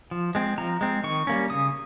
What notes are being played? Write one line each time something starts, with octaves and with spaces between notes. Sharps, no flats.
F3
G#3 C4
F3 A#5
G#3 C4
D#3 C#6
G3 A#3 C#4
C#3 D#6